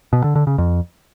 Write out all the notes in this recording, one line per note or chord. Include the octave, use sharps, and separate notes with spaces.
B2
D3
D3
C#3
F2